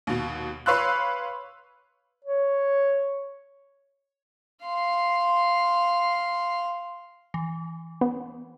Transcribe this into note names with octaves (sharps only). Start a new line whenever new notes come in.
D#2 B2
B4 C#5 F5 C6 E6 F#6
C#5
F5 C6
E3
B3